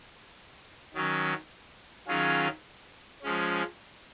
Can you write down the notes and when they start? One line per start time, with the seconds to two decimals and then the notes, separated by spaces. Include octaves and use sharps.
0.94 D#3 F#3 C#4
2.07 D#3 F#3 C#4 F4 G#4
3.22 F3 G#3 C#4